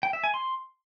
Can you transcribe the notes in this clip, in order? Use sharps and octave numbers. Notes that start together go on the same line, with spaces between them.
G5
E5
G#5
C6